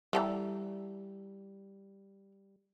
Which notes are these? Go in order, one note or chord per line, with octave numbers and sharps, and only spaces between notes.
E3 G3 A4 A#5